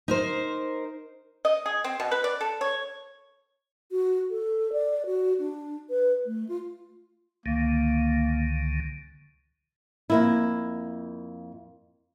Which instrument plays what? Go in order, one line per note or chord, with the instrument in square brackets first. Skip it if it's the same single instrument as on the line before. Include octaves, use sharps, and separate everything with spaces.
[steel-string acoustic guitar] D#4 A#4 C5
[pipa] D#5
G#4
C4
B2
B4
D5
A4
C#5
[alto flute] F#4
A4
D5
F#4
D4
B4
A3
F4
[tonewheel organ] C#2 D3 D#3 [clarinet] A#3
[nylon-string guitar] F2 A#3 E4